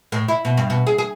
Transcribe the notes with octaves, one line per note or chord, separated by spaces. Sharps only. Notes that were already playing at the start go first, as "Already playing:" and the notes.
A2
E4
B2
G2
B2
G#4
G#4